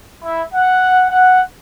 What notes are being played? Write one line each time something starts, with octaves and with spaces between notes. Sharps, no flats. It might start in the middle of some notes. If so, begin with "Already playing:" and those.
E4
F#5
F#5